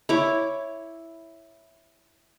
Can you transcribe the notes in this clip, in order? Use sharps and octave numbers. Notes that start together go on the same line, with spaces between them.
E4 C#5 C#6 D6